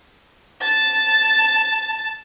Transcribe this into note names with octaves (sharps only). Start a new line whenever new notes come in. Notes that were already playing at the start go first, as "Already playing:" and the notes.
A5 A6